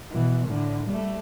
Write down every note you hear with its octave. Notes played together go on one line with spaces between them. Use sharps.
B2 E3
A2 D3
G3 A3